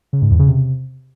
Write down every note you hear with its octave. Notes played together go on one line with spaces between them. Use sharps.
C#3
G#2
E2
C#3
C3